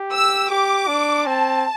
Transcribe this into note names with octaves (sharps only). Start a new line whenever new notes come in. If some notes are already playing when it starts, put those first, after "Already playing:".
Already playing: G4
E6
G4 D6
D4
C4 A5